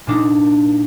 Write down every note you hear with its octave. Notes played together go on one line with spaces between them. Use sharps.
A#2 D4 D#4